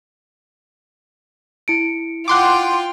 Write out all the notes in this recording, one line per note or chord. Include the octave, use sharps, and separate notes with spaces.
E4 C#7 D7
F4 F#5 G5 C6 D6